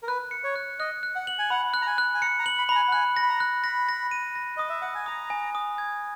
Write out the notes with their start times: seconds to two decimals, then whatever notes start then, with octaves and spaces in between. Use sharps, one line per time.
0.03 A#4
0.07 B4 F#6
0.31 C#7
0.44 C#5
0.56 F#6
0.80 D#5 F#6
1.03 F#6
1.15 F#5
1.27 F#7
1.39 G#5
1.50 F#5 B5
1.74 F#6
1.82 A#5
1.87 G#5
1.98 F#6
2.14 G#5
2.21 A#5 C#7
2.39 A#5
2.46 F#7
2.58 B5
2.69 A#5 B5
2.75 G#5
2.88 F#5
2.92 G#5 F#6
3.16 A#6
3.22 B5
3.29 A#5
3.40 F#6
3.64 B5 A#6
3.89 A#6
4.11 D#7
4.35 A#6
4.57 D#5 D#6
4.69 E5
4.81 F#5 D#6
4.95 G#5
5.06 A#5 D#6
5.30 G#5
5.55 D#6
5.78 G#6